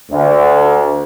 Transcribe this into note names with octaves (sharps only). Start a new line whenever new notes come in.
D2